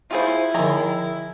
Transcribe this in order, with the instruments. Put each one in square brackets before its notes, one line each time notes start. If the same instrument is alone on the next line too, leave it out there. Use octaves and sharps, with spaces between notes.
[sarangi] E4 [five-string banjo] F4 G#4 C5
[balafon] D3 F3 [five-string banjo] D#3 G#4 A#5